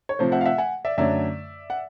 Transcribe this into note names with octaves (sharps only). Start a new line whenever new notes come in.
C#5
C3 F3 A3 C5
E5 F#5
F5
E5 F#5
F#5 G#5
D5 E5
F#2 D3 F#3 A3 D5 E5
F#5